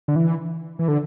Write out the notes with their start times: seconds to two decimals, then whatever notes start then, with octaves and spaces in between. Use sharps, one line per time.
0.08 D3
0.16 E3
0.79 E3
0.88 D3